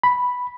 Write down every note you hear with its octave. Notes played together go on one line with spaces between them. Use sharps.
B5